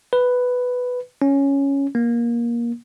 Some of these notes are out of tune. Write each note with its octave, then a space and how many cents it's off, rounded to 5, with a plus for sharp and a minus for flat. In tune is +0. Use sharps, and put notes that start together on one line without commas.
B4 +5
C#4 +0
A#3 +20